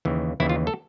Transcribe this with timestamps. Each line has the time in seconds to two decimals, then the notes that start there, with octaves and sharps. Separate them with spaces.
0.05 D#2 C#3 E3
0.40 D#2 C#3 E3 E4
0.49 F4
0.67 A4